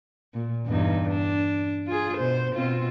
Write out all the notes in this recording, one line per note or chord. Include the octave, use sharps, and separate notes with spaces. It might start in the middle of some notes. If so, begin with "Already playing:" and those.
A#2
E2 G2 D#4
D4
F4 G#4
B2 C5
B2 C4 F4